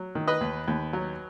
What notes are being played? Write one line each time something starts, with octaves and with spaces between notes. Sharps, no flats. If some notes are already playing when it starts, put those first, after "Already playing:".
Already playing: F#3
D#3
B4 D#5
D#2
D#2
F#3